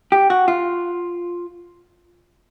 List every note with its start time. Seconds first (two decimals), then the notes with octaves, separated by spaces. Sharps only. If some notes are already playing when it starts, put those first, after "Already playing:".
0.12 G4
0.30 F#4
0.48 F4